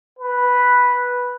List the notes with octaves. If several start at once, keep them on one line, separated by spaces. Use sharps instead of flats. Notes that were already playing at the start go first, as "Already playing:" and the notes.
B4